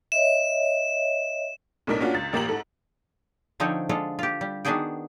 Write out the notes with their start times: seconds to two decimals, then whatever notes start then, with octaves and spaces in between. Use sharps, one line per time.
0.12 C#5 D#5 E5 E7
1.87 B1 A2 D4 D#4 A#4 B6
2.01 A#3 C#4 D4 F4 F#4
2.14 C#2 A6
2.33 A1 A#3 G4 A#5 F#7
2.48 G#2 A4
3.60 D3 F3 C4 D#4 A4 C#5
3.89 D3 G#3 F4 A4
4.19 F4 G4
4.41 G3
4.65 D#3 B3 D4 F#4 G#4 G5